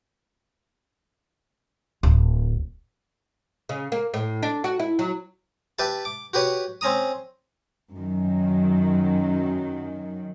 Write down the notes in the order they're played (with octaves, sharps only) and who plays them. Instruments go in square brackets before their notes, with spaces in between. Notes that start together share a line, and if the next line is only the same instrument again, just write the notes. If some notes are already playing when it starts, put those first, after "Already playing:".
[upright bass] D1
[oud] C#3
A#3
A2
D4
F#4
E4
F#3
[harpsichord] G4 B4 E5 A5
D6
F#4 G4 B4 C#5
C4 C#4 A#5 D#6
[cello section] F#2 D#3 F#3